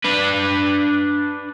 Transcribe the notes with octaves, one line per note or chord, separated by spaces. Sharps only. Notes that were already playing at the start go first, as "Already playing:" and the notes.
D4 B4